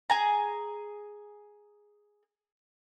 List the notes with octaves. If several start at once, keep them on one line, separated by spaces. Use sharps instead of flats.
G#4 G#5 A#5